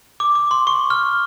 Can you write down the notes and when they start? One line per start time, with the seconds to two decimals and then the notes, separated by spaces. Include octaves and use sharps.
0.20 D6
0.35 D6
0.51 C6
0.67 C#6
0.90 F6